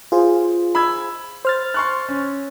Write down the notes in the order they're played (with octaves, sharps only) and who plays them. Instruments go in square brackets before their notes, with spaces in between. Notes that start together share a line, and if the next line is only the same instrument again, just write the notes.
[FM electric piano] F4 G#4 C5
[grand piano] B5 E6 G#6
[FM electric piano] C5 F6 A6
[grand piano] C6 C#6 F#6
C#4